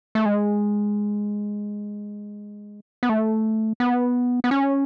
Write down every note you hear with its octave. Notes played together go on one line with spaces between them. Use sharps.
A3
G#3
B3
A3
B3
B3
C#4